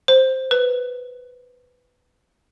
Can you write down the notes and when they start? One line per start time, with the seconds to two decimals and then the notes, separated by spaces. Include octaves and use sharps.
0.08 C5
0.51 B4